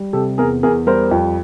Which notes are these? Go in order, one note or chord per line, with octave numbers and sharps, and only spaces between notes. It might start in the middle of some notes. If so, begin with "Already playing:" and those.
Already playing: G3
C3 G4 A4
E2 G#4 A#4
E2 G#4 A#4
G3 A#4 C5
F2